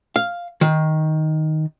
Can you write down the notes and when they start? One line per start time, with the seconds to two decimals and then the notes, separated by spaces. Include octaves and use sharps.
0.16 F5
0.61 D#3